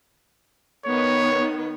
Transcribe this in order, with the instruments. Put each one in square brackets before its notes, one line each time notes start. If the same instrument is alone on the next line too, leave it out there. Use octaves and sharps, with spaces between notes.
[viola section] D#3 B3 [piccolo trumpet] C#5